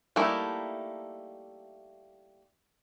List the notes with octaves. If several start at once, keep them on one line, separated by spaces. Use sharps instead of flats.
G3 A3 A#3 D#4 E4